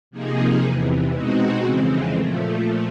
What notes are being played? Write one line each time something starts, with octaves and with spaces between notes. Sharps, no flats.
C3 F3 A#3 D#4 G#4
E2 C3 E3
B2 G#3 C4 D#4 F#4
F2 C#3 E3 G#3 C4
A#2 F3 A3